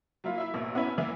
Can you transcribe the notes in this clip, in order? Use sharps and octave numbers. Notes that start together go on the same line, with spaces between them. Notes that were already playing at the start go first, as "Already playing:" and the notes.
F#3 A#3 E4 F4
E4 E5
A1 B2 A#3
B3 C#4 E4
E3 A#3 E4